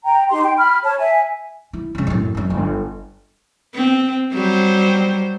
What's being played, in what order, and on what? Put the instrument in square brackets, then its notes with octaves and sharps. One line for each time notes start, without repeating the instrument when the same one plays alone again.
[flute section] G5 A#5
D#4 G4 C6
G5
B5 F6
C#5 A5
E5 G#5
[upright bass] E4
C2 C#3
F#2 A2
F#1 F#2
G1
[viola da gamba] C4
F#3 G3 C5